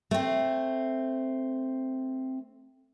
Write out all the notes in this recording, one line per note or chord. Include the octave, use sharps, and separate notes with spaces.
A3 C4